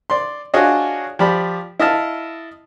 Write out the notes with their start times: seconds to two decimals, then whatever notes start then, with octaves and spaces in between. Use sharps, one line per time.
0.10 D5 C6
0.54 D4 F4 F#4 G#4 C#5 D#5
1.19 F3 G4 D5 B5
1.80 E4 D#5 F5 A5